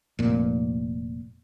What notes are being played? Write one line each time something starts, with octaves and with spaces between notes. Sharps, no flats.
F1 A#2